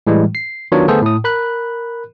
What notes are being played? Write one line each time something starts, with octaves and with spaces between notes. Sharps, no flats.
A2 E3 G3 G#3
C7
D#3 F#3 B3 D4 F4 C#5
D3 A3 B3 G#4 A4 C5
A2 D#6
A#4 B5 F#6